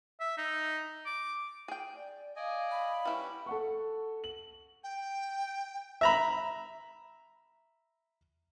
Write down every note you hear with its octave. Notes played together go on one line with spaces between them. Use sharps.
E5
D#4
D6
G#4 G5
D5
D5 D#5 F5 G#5
B5
G3 C#4 E4 B4 F#5
A4 F#5 C#6
F#7
G5
E5 A#5 B5